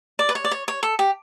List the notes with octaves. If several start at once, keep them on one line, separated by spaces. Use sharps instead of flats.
D5
B4
C#5
D5
C#5
C#5
A4
G4